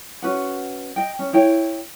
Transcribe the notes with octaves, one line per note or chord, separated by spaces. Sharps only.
C#4 F#4 B4 F#5
D#5 G5
C#4
E4 C#5 G5